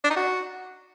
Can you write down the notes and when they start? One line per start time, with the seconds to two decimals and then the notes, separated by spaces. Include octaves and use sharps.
0.04 D4
0.10 D#4
0.16 F#4